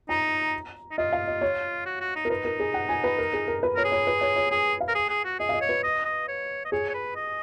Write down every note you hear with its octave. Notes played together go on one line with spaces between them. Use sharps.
D#4 A#5
D#4
F4 D#5
F5
D#5
C#5
F#4
F#4
D#4
A#4
D#4 B4
A#4
G#4
F#5
G#5
B4
A#4
G#4
A#4
B4
A#4 C#5
G#4
C#5
B4
C#5
C#5
G#4 G#5
F5
A#4
G#4
G#4
F#4
G#4 D#5
F5
D#5
C#5
B4
D#5
D#5
C#5
D#5
G#4 C#5
C#5
B4
D#5